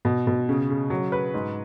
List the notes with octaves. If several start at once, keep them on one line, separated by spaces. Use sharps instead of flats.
B2
B2
C#3
C#3
F#3
B4
G#2